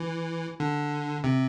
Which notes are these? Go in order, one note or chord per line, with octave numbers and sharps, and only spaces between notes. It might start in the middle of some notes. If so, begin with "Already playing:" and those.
Already playing: E3
D3
C3